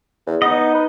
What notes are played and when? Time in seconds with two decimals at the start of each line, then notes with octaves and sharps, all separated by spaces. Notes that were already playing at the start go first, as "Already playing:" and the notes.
0.27 E2
0.42 B3 D#4 D#5
0.74 B4